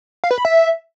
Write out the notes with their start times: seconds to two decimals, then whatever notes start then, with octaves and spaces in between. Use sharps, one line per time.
0.24 F5
0.31 B4
0.38 B5
0.45 E5